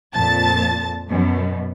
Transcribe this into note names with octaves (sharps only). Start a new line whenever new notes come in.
F2 A#2 A5 A6
F#2 B2